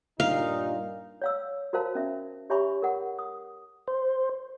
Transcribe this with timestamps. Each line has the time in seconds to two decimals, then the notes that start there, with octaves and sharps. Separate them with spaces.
0.20 G2 A#2 D#4 F5
1.22 C#5 F5 E6
1.73 F#4 A#4 C5 F5 A5
1.95 C#4 E5
2.50 G4 C#5 E5 G#5 B5 C#6
2.82 A#4 F#5
3.19 D#6
3.88 C5